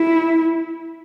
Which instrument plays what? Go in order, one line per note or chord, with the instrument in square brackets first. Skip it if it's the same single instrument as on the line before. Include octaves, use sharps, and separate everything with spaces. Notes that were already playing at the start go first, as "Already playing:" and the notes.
Already playing: [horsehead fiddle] E4